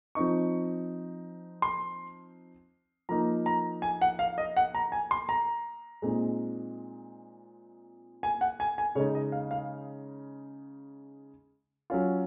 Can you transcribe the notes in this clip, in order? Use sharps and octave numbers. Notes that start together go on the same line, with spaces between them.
F3 C4 D#4 C#6
C6
F3 A#3 D#4 A#5
A#5
G#5
F#5
F5
D#5
F#5
A#5
G#5
C6
A#5
A#2 G#3 C4 D#4
G#5
F#5
G#5
G#5
C#3 G#3 D#4 C#5
D#5
F5
F5
F#3 C#4 F4